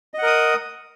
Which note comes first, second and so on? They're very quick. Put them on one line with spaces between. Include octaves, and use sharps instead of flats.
D#5 F#5 A#4 D#6